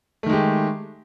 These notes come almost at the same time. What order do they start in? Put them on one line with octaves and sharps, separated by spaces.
A3 D#3 G#3 G4